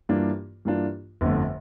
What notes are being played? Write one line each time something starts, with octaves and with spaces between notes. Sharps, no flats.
G2 E3 A#3 D4 F4
G2 E3 A#3 D4 F4
G1 F2 D3 A3